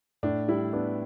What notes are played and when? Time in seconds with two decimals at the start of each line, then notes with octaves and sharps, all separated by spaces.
0.23 A2 D4
0.48 G3 E4
0.73 B3 D4